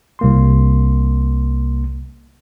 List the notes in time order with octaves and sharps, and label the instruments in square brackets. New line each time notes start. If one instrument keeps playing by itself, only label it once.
[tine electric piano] C2 A#3 C6